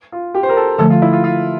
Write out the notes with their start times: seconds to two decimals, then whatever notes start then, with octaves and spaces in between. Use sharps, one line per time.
0.12 F4
0.34 G4
0.43 C5
0.49 A#4
0.57 A4
0.79 D3 F3 A3 A4
0.90 F4
1.02 E4
1.13 F4
1.24 F4